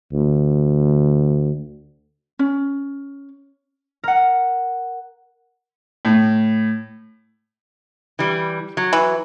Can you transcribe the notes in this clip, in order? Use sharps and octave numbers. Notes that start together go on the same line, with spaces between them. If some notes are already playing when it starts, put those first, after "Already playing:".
D2
C#4
A#4 F#5
A2
E3 G3
F#3
E3